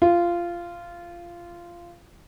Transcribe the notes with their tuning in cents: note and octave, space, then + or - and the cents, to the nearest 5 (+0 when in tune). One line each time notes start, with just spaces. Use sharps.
F4 -15